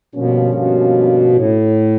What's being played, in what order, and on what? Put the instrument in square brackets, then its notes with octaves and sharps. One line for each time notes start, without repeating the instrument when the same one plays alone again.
[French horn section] G2 D3 F3 A#3 C#4 [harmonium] B2
[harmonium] B2
A2